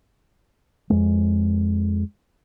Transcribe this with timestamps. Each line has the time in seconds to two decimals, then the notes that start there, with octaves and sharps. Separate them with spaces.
0.90 F2 G#3